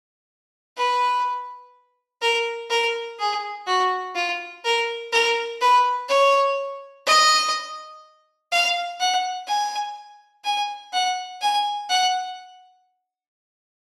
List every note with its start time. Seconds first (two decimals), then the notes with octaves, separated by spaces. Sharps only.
0.77 B4
2.22 A#4
2.70 A#4
3.19 G#4
3.67 F#4
4.15 F4
4.65 A#4
5.12 A#4
5.61 B4
6.09 C#5
7.06 D#5
8.52 F5
9.00 F#5
9.48 G#5
10.44 G#5
10.93 F#5
11.41 G#5
11.90 F#5